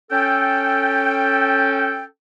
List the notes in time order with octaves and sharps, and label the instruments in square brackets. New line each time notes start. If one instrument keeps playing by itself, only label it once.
[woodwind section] C#4 A4 G5